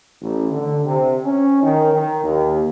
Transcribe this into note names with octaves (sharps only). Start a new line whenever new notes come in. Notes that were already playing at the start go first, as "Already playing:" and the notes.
A1
D3
C3
C#4
D#3
D#3
D#2